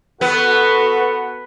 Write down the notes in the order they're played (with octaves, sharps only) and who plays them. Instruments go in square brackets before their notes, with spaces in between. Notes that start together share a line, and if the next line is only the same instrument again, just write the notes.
[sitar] B3 [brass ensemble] F#4 A4 [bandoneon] B4